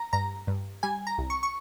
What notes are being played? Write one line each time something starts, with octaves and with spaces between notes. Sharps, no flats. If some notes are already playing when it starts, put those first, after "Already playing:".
Already playing: A#5
G2 A#5
G2
G3 G#5
A#5
C2
C#6
C#6